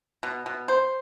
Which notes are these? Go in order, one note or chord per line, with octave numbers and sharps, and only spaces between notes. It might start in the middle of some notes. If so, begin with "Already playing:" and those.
B2
B2
C5